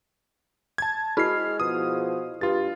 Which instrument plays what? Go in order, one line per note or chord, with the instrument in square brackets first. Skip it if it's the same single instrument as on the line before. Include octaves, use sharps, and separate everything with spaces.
[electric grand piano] A5 G#6
[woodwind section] G#3 F6 [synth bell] E4 F#4 G#4 [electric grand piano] B5 C7
[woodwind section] B2 F3 [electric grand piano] D#6
[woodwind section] G2 [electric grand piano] F4 A6